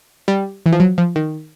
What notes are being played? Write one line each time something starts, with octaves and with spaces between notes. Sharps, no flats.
G3
E3
F3
F#3
F3
D#3